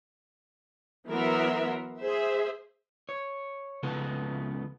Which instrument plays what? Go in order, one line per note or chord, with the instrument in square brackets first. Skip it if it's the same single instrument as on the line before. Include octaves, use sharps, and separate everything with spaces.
[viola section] E3 F#3 B3 A#4 E5 C6
G#4 C5 E5
[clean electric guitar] C#5
C#2 C#3 F3 B3 A4 B4